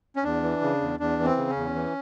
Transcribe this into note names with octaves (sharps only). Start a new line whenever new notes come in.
C#4
E2 D4
E3
C#3
E2
E2 D4
E3
C4
C#3
C#4
E2
E3